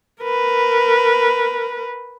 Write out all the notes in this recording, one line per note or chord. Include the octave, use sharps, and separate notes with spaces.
A#4 B4